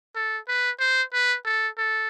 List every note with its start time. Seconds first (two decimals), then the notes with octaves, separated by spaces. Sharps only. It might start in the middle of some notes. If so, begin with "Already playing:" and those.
0.15 A4
0.48 B4
0.80 C5
1.13 B4
1.45 A4
1.78 A4